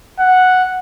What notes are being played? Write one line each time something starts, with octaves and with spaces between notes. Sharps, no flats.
F#5